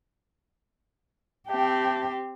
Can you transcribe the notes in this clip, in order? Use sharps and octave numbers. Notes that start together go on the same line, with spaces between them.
C4 G4 E5 G5 A5